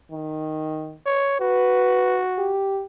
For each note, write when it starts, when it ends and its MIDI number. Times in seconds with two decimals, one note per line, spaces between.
0.11 0.94 51
1.06 1.36 73
1.40 2.55 66
1.40 2.18 71
2.38 2.83 67